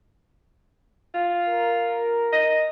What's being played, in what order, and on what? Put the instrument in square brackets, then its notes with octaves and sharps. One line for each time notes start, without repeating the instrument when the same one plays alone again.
[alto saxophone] F4
[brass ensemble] A#4
[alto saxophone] D#5